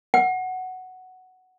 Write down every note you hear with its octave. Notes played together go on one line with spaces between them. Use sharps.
F#5